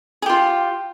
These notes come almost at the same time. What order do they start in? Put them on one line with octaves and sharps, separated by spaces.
G#4 G4 F4